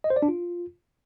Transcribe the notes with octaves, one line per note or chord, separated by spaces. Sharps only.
D#5
C5
D5
D4
F4